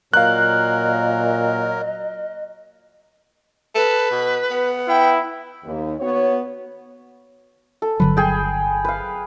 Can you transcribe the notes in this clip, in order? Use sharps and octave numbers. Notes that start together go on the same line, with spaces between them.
A#2 F#3 A#4 D#5 F5 F#6
A4 B4
B2
B3
E4 G5
D#2
B3 F#4 C#5
A4
G1 D3 F#3 B4
G#4 G5
B4 F5